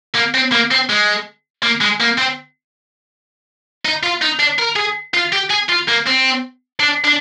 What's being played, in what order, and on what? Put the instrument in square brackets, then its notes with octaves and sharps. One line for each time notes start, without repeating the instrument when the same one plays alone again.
[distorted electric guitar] A#3
C4
A#3
C4
G#3
A#3
G#3
A#3
C4
D#4
F4
D#4
D4
A#4
G#4
F4
G4
G#4
F4
A#3
C4
D4
D4